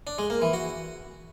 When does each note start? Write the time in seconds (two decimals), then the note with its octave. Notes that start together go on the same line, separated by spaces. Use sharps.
0.07 D4
0.18 G#3
0.30 A#3
0.42 E3
0.53 F#4